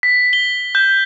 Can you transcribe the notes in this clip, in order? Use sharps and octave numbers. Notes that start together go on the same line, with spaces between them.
B6
G7
G6